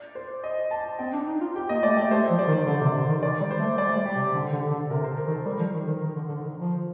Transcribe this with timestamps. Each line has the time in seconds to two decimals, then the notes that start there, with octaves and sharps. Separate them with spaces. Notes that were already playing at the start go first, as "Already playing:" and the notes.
Already playing: D5
0.15 C5
0.44 D#5
0.71 A5
0.99 C4 G5
1.13 D4
1.27 D#4
1.41 F4
1.56 G4 G5
1.69 A#3 D#5
1.83 A3 D5
1.96 A3 G4
2.10 A3 C5
2.30 F3
2.39 D5
2.48 D#3
2.66 D3
2.81 C3
2.94 D3
3.09 D#3
3.23 D#3 D5
3.41 G3
3.51 C5
3.59 A3
3.78 G3 D5
3.87 A3
3.96 G3
4.06 G4
4.16 C3
4.34 D3 A4
4.52 D3
4.71 D3
4.90 C3 A#4
5.04 C5
5.17 A#4
5.27 D#3
5.31 A4
5.45 G3 A#4
5.59 F3
5.74 D#3
5.88 D#3
6.01 D#3
6.16 D3
6.29 D3
6.43 D#3
6.58 F3